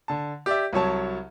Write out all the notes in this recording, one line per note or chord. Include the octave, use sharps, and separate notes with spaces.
D3 A5
G4 D5 E5
C2 F#3 C#5 A5